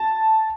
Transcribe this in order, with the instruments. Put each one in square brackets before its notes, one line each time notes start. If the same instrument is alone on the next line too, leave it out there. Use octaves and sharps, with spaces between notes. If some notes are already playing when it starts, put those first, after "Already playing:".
Already playing: [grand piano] A5